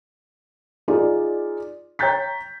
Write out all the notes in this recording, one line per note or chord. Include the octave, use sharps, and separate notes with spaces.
D#4 F4 G#4 D5
C#5 G5 A#5 G6 A6 B6